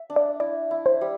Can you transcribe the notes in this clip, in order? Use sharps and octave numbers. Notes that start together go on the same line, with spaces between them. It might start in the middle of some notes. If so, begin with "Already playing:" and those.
Already playing: E5
D4
D5
E4 D5
E4
C5
G3